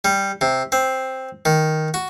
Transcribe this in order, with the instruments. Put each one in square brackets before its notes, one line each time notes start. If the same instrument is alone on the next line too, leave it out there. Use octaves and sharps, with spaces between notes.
[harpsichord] G3
C3
C4
D#3
F#4